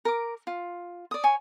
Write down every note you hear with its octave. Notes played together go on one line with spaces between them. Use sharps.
A#4 D6
F4
D5 D#6
C#5 G#5